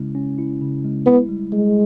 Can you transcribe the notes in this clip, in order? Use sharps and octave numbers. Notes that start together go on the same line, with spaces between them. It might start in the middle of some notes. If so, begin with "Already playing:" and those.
Already playing: C#3 G#3 C#4 E4
C#4
E4
C#3
G#3
B3 E4
G3
G3 G#3